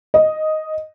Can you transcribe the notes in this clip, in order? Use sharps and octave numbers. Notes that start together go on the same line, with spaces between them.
D#5